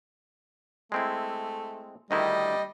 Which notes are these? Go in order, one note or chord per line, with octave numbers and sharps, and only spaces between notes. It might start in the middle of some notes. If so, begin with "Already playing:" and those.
G#3 A3 C4 E4
D2 D#3 G3 E4 D#5